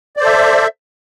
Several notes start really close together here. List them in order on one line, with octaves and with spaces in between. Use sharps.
D5 C5 A4 E5